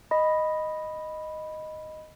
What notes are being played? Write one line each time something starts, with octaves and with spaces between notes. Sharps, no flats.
D#5 B5